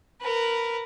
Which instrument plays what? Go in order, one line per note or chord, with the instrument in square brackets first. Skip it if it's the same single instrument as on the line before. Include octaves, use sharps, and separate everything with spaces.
[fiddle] A#4 B4